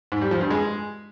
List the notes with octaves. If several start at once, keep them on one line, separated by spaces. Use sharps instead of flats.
G#2
G3
F3
G2
G#3